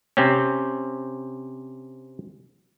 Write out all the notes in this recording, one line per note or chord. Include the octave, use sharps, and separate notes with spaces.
C3 C4 C#4